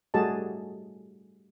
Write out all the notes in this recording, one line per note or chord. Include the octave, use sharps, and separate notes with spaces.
G3 A3 F#4 G#4 D#5 A5